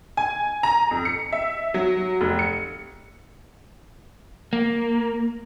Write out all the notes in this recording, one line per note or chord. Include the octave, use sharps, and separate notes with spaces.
G#5
A#5
F2
C#7
E5
F#3
F1
C#7
A#3